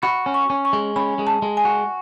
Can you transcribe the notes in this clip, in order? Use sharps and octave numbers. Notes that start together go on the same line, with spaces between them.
F#4 B5
C#4
C#6
C#4
C#6
G#3
C#4 B5
G#3
A5
G#3
G#5
F#4